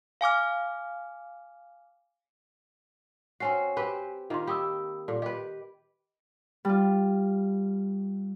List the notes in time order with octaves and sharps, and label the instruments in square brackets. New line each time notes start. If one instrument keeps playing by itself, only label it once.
[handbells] F5 G#5 D6 F6
[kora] C4 C#4 F#4 [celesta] G#5 C7
[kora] C4 G4 B4
[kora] D#3 A#3 [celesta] F4 D#5 C6
[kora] G4 [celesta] B5 D#6 E6
[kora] A#2 [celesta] A4
[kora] G4 B4 [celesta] D#5
[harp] G3 F4